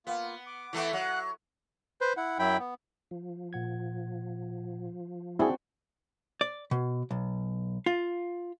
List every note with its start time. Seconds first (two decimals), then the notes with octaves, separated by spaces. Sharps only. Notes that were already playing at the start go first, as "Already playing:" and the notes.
0.07 A#3 B3 F4
0.47 D6
0.73 E3 A3 B3
0.93 F#3 F#5 F#6
2.01 B4 C5
2.17 E4 F#5
2.39 F#2 F#3 E4 G5 B5
2.59 B3
3.11 F3
3.53 A#2 F#5 G#6
5.39 C4 D4 E4 F#4 G#4
6.41 D5
6.71 B2
7.11 B1
7.86 F4